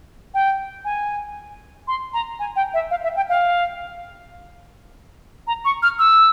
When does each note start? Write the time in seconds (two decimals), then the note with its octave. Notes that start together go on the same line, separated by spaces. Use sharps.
0.34 G5
0.85 G#5
1.88 C6
2.13 A#5
2.39 G#5
2.56 G5
2.74 E5
2.91 F5
3.03 E5
3.16 G5
3.29 F5
5.47 A#5
5.65 C#6
5.83 F6
5.99 E6